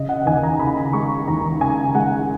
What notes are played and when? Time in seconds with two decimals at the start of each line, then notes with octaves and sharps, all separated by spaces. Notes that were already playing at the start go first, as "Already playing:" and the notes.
Already playing: C#3 D#5
0.09 F#5
0.22 F#5
0.26 D#2 G#5
0.43 A#5
0.60 C#3 B5
0.77 B5
0.93 G#3 C#6
1.28 D#2 A#5
1.61 C#3 G#5
1.95 G#3 F#5